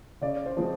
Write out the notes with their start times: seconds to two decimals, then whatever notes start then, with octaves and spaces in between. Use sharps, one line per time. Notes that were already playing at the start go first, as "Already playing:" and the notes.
0.21 C#3 D5
0.46 C5
0.57 F3 G#3 C4